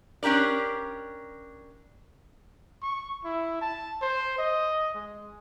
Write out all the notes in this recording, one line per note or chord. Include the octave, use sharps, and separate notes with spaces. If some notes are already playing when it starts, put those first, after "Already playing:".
C#4 D4 G4 A#4 D5
C#6
E4
A5
C5
D#5
G#3